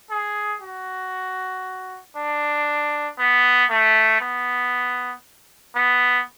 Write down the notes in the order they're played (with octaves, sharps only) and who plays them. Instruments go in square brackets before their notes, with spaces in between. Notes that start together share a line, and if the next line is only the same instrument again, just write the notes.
[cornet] G#4
F#4
D4
B3
A3
B3
B3